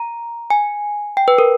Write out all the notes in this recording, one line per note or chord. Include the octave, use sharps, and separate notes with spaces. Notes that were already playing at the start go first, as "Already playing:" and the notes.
Already playing: A#5
G#5
G5
B4
A#4